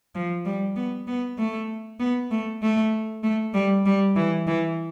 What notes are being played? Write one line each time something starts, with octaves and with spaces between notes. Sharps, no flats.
F3
G3
B3
B3
A3
B3
A3
A3
A3
G3
G3
E3
E3